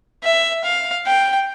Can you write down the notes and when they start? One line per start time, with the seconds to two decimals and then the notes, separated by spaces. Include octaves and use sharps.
0.24 E5
0.64 F5
1.06 G5